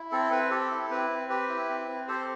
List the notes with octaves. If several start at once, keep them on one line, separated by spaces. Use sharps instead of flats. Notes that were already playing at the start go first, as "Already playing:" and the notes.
Already playing: E4
C4 A4
C4 B4
G4 A4
E4
C4 B4
C4
G4 B4
E4
C4
C4
G4 A4 C5